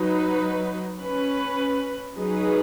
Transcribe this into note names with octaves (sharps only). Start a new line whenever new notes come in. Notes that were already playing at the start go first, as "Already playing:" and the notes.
Already playing: F#3 D#4 B4
C#4 B4
F#3 D#4 G#4 B4